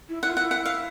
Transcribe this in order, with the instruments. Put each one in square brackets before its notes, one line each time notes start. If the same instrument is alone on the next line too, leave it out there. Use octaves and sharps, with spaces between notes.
[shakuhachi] E4
[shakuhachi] E4 [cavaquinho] F#5
[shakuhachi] F4
[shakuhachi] E4 [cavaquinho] F#5
[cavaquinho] F#5
F5